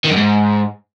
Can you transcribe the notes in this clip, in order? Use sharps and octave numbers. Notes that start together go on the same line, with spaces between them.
D#3
F#2
G#2